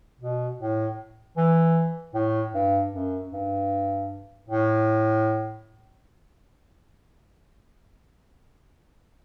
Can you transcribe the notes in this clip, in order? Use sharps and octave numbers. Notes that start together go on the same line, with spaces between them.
B2
A2
E3
A2
G2
F#2
G2
A2